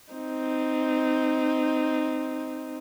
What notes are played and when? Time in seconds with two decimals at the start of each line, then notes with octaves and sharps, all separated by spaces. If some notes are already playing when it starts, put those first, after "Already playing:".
0.13 C4 D#4